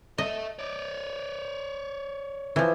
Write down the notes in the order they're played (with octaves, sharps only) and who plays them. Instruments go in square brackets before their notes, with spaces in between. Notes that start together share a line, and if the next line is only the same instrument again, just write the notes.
[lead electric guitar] A4 E5 [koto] D#5
[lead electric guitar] C#5 D5
[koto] E3 F3